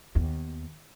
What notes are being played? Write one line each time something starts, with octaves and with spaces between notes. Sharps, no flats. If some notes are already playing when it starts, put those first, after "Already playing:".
D#2 B3